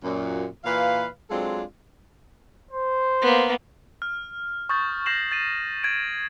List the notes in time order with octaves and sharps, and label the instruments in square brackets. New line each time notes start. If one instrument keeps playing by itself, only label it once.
[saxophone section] F#2 A#2
A#2 E3 B4 F5
F#3 G#3 C4 D4 F4 A4
[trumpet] C5
[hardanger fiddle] A#3 B3
[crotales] F6
C#6 D#6 G6 A6
C#6 G6 A#6 C7 E7 F#7
A6 D#7
G6 G#6 D7